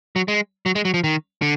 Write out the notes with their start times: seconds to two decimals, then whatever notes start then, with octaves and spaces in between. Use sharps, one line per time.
0.16 F#3
0.28 G#3
0.66 F#3
0.76 G#3
0.85 F#3
0.94 F3
1.04 D#3
1.42 D3